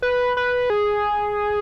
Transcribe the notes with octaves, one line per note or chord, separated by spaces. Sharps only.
B4
B4
G#4